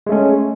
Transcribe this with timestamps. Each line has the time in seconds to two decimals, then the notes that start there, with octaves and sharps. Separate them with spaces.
0.07 G#3
0.09 A3
0.12 C#4